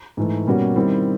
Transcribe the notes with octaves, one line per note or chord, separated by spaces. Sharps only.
G#2 E3 A3
B2 G3 A#3 C#4 F#4
D#3 G3 C4 E4